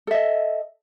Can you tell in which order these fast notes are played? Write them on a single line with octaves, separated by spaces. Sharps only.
A4 E5 D#5